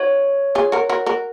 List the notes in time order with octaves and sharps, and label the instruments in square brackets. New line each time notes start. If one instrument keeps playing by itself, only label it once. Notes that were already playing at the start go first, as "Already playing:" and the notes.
Already playing: [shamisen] D#4 F#4 [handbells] C#5
[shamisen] F4 G#4
F#4 A#4
F#4 A#4
F#4 A#4